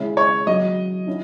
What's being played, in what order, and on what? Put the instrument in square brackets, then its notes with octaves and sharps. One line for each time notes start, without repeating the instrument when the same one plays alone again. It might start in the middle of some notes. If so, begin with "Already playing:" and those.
Already playing: [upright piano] C#3 G#3 C#4 E4
[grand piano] C#5
[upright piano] F#3 C#4 F#4 [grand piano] D#5
[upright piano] C#4 E4